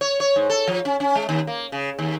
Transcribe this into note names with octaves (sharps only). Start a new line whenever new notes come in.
C#5
C#5
G#2
A4
F3
C#4
C#4
G#3
D#2
A#3
C#3
D#2